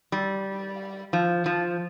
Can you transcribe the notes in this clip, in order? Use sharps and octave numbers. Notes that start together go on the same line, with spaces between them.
G3
F3
F3